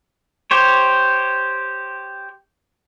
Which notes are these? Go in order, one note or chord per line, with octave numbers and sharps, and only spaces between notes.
G4 C5 C#5